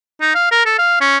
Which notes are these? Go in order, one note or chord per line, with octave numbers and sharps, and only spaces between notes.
D#4
F5
A#4
A4
F5
C#4